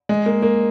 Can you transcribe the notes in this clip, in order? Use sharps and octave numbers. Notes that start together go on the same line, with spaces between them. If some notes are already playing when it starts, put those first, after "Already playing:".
G#3
A#3
A#3